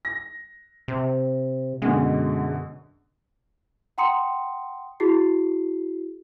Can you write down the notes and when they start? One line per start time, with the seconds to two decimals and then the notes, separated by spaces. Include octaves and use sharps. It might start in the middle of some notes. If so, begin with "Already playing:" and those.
0.05 A#6
0.88 C3
1.82 F#2 B2 D3 G#3
3.98 F#5 G5 A#5 C6 D#6 C#7
5.00 E4 F#4 G#4 C7